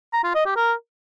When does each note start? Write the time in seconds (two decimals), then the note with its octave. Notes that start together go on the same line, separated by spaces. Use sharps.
0.13 A#5
0.24 F4
0.35 D#5
0.45 G4
0.56 A#4